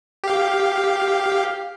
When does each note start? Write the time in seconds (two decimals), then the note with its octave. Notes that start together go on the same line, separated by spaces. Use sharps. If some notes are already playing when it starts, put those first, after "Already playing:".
0.24 G4 F5